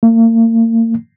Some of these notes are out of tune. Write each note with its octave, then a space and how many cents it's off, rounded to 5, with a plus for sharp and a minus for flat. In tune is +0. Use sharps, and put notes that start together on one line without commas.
A#3 -40